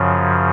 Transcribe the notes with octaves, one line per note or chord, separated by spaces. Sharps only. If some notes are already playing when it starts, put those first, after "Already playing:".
Already playing: F#2 C#3 F3